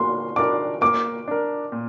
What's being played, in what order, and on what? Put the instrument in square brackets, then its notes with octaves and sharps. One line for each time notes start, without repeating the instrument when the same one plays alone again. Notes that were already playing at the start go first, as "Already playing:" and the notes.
Already playing: [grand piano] A#3 [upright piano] C6
[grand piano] D4 A#4 D5 [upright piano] D6
[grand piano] A#3 [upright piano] D6
[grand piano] D4 A#4
A#2